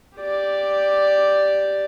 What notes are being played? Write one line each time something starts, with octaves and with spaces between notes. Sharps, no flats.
G4 D5